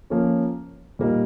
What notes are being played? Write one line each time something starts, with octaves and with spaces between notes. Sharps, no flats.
F3 A#3 C#4
A#2 G3 A#3 D#4